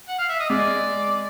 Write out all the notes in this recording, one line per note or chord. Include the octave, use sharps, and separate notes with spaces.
F#5
F5
E5
D#5
G#3 D5